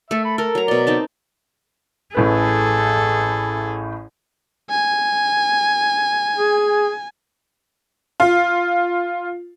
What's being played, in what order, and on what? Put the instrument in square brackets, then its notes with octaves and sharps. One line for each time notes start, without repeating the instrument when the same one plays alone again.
[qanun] A3 A4 [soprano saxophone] E5
[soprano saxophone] B5
[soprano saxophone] A4 [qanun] A#4
[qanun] F#3 A#5
[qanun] B2 C6 [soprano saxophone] D5
[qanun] C4 D#4 A5
[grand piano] A1 A2 B4 [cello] G#4 A4
[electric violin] G#5
[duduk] G#4
[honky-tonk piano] F4